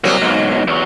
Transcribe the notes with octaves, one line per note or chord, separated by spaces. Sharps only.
C2 F#3 A#3
B1 G#2
E2 F#3